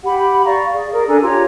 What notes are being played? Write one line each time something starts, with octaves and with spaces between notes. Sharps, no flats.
G4 F#5 B5
D5 F5 A#5 C#6
G#4 D5
G#4 A#4
D4 A4 G#5 A#5
F4 G4 C#5 A#5